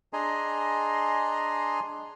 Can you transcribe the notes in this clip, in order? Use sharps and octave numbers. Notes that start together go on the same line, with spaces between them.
D4 G#4 D#5 G#5 A#5 C6